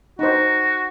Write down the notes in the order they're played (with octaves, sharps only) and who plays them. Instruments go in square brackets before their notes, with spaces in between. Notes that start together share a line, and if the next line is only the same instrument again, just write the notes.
[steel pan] D#4 C5 [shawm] F#4